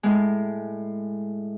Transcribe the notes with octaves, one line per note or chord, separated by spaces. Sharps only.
A2 G#3